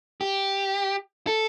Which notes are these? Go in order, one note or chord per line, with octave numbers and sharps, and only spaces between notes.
G4
A4